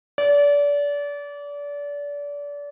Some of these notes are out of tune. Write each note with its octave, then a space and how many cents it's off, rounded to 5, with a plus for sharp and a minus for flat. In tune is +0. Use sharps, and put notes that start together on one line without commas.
D5 -30